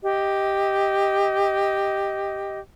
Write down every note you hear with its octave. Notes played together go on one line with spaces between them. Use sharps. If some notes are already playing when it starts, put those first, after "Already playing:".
G4 D#5